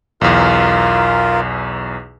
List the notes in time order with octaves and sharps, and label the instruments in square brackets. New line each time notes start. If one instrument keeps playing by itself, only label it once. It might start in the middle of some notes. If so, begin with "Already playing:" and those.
[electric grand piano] B1 E2 [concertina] F4 A#4